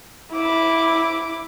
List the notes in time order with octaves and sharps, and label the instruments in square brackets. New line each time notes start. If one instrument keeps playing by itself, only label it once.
[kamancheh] E4 D6